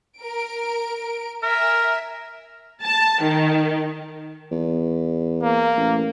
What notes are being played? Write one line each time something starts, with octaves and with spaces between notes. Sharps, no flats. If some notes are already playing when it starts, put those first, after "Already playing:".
A#4 D7
A#4 E5 G#5
A5
D#3
E2
A#3
A1